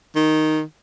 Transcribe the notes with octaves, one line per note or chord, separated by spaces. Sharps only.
D#3